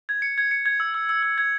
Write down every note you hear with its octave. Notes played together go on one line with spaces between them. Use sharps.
G#6
C#7
G#6
C#7
G#6
E6
E6
E6
E6
G#6